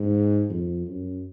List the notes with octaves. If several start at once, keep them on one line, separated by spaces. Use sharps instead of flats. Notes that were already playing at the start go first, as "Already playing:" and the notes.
Already playing: G#2
F2
F#2